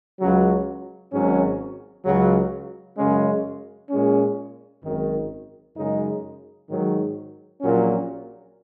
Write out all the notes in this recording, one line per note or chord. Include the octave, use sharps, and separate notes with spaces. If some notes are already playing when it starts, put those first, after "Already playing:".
C#2 C#3 F#3
G#1 G#2 F#3 C#4
C#2 C#3 F#3
F#2 C#3 G#3 C#4
A#2 G#3 C#4
G#1 F#2 D#3
F#2 C#3 G#3 D#4
G#2 D#3 F#3
A#1 A#2 F#3 C#4